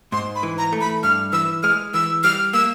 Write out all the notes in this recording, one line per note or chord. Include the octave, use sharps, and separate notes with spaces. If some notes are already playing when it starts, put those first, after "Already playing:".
G#2 C6
B5
E3
A#5
A3
B5
G2 F6
E3 E6
G#3 F6
E3 E6
G3 F6
A#3 E6